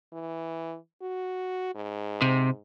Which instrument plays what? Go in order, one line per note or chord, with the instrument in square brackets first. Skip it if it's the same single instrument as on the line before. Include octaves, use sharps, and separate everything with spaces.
[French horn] E3
F#4
G#2
[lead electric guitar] C3